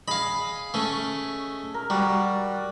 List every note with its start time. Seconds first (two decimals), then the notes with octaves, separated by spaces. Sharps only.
0.08 G#4 D#5 F5 B5
0.74 A3 C#4
1.74 A#4
1.90 G3 F#4 D5